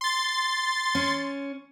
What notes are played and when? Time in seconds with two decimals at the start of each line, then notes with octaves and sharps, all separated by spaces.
0.01 C6 A6
0.95 C#4